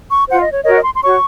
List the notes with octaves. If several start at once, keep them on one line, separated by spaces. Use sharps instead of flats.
C#6
F4 C5 F#5
D#5
C#5
F#4 A#4 C#5 D#5
D#5
C6
C6
F#4 C#5 C#6